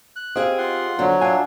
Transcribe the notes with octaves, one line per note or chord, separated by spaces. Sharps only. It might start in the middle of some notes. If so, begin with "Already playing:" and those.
F#6
C4 G4 G#4 D#5 F5
F4 F#5 C6
F2 D3 F#3 F#4
D4 F4 E5 F#5 G#5